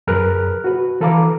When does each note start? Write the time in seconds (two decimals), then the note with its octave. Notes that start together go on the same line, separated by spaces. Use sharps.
0.07 F#2 G#4 A#4 B4 F6 F#6
0.64 F#4 B4
1.01 E3 A4 B4 F5 A#5 D6